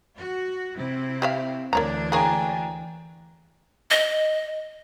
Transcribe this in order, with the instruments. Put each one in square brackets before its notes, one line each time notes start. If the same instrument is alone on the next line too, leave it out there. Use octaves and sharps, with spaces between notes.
[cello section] F#4
C3 C4 E4
[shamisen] G4 E5 F5
[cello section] D2 E3 D4 [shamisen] A#4 C#5 A#5
[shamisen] A#3 G#4 C#5 [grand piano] G5 G#5 A#5
[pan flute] D#5